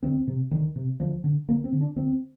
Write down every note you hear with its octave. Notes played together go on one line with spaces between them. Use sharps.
D2 C4
C3
D2 D#3
C3
D2 F3
D3
D2 A#3
C4
D3
D4
D2 C4